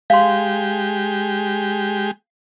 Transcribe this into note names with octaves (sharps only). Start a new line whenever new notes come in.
G#3 G4 F5 C6